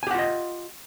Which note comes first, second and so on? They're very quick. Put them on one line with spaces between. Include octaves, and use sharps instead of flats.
G#5 G4 F#5 F4 D#5